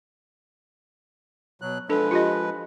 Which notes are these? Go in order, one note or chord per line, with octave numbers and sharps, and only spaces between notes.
B2 F#3 F#6
F3 G#3 D4 A4 B4
F4 G4 D#5